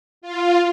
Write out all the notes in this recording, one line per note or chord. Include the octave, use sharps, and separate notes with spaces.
F4